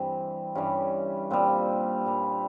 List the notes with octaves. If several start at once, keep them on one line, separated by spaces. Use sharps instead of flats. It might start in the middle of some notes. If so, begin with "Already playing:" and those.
Already playing: G2 E3 G3 C4
G2 E3 G3 C#4
A#2 G3 C4
A#2 G3